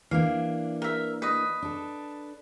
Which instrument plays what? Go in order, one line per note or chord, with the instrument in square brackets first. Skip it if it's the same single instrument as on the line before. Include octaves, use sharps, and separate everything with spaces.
[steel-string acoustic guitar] E3 A#3 D4 [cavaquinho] F5
[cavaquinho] A#4 E5
B4 D#5
[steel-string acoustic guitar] D4 A4